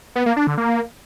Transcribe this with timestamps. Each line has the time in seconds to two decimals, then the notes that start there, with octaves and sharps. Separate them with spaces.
0.16 B3
0.26 A#3
0.37 D4
0.47 D3
0.57 A#3